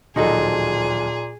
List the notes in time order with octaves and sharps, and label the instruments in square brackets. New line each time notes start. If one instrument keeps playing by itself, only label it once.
[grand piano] D1 D#2 F3 [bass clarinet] A#2 [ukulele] D#4 F#4 A4 [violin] G#4